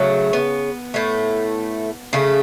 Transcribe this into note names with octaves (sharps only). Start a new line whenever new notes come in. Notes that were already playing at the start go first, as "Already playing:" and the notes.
Already playing: C#3 F#3 A3
B3
A2 A3
C#3 A3